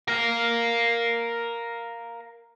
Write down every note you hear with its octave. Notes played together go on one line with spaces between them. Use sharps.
A#4 F5